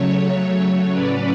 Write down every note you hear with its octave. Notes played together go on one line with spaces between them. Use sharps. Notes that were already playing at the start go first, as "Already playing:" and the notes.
Already playing: C#3 F#3 A3 C#5
A2 F#3 C#4 B4 D5